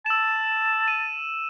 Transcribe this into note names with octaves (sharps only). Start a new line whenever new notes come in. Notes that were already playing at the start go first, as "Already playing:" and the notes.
A5 E6 E7
D#7